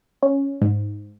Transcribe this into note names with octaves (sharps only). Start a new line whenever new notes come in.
C#4
G#2